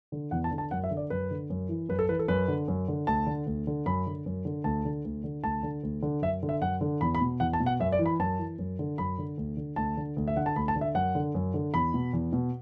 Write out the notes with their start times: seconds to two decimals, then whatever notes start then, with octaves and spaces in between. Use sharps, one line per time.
0.12 D3
0.31 E2 F#5
0.44 A5
0.51 D3
0.58 A5
0.71 F#2 F#5
0.84 E5
0.91 D3
0.97 D5
1.10 F#2 B4
1.31 D3
1.50 F#2
1.69 E3
1.89 F#2 B4
1.99 A4
2.09 E3 B4
2.19 A4
2.28 F#2 B4
2.48 D3
2.68 F#2
2.88 D3
3.07 D2 A5
3.26 D3
3.46 D2
3.67 D3
3.86 F#2 B5
4.06 D3
4.26 F#2
4.45 D3
4.64 D2 A5
4.85 D3
5.05 D2
5.24 D3
5.43 D2 A5
5.63 D3
5.83 D2
6.02 D3
6.22 F#2 E5
6.43 D3
6.49 E5
6.61 F#2 F#5
6.81 D3
7.01 E2 B5
7.15 B5
7.21 B2
7.40 E2 F#5
7.53 A5
7.60 B2
7.66 F#5
7.80 F#2 E5
7.92 D5
7.99 E3
8.06 B5
8.20 F#2 A5
8.39 E3
8.59 F#2
8.79 D3
8.98 F#2 B5
9.18 D3
9.38 D2
9.57 D3
9.76 D2 A5
9.97 D3
10.17 D2
10.28 E5
10.36 D3 F#5
10.46 A5
10.56 D2 B5
10.68 A5
10.76 D3
10.81 E5
10.95 F#2 F#5
11.15 D3
11.35 F#2
11.54 D3
11.74 E2 B5
11.94 B2
12.13 E2
12.33 B2